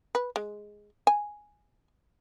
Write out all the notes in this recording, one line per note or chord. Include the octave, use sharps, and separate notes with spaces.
B4
G#3
G#5